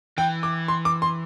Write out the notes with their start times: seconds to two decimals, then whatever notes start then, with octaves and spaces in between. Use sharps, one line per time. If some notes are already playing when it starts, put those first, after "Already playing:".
0.18 E3 G5
0.43 D6
0.68 C6
0.85 D6
1.02 C6